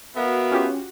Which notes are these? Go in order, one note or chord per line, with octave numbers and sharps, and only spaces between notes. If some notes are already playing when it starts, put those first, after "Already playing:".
B3 F#4 A#4 E5 F5
C#4 F4 G4